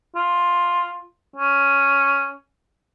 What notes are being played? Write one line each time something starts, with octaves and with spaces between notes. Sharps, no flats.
F4
C#4